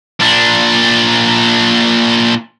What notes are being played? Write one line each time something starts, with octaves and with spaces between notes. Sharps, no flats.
A#2 D4